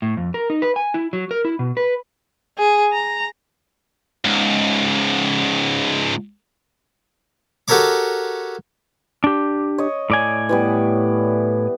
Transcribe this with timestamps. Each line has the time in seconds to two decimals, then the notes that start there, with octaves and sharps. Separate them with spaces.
0.02 A2
0.17 F2
0.34 A#4
0.50 D#4
0.62 B4
0.76 G#5
0.94 E4
1.13 F#3
1.31 A#4
1.45 E4
1.59 B2
1.77 B4
2.58 G#4
2.93 A#5
4.24 C#2 G#2
7.68 F#4 G4 A4 A#4 C#5 D6
9.24 D4 G4
9.78 C#5 D#5
10.10 A2 D5 G#5
10.49 E3 G3 B3